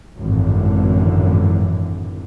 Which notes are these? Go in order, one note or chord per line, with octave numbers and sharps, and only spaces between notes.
G#1 F#2 A2 D3 E3